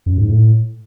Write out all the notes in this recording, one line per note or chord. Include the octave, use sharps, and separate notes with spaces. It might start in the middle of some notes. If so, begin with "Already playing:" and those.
F#2
G#2
A2